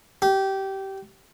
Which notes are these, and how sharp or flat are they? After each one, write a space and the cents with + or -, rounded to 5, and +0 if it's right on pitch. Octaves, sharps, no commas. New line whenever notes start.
G4 -20